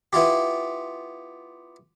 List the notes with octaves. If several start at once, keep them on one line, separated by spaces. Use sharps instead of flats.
B3 E4 F4 G4